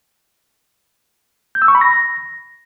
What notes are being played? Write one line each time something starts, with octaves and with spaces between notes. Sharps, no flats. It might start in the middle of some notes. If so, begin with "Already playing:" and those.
G6
E6
C#6
B5
A#6